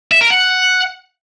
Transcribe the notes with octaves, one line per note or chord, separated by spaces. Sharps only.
E5
A#4
F#5